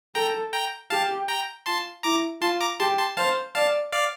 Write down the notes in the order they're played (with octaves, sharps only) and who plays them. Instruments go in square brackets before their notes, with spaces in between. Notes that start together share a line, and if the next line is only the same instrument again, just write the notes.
[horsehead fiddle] A4 [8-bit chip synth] G5 A#5
[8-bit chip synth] G5 A#5
[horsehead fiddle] G4 [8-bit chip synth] F5 A5
[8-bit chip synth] G5 A#5
[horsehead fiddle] F4 [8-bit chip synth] A5 C6
[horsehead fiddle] E4 [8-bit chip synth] A#5 D6
[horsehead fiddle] F4 [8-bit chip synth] A5 C6
[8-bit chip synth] A#5 D6
[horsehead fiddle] G4 [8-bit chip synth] A5 C6
[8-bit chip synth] A5 C6
[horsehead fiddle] C5 [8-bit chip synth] F5 A5
[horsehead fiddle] D5 [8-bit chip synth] F5 A5
[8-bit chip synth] D5 F5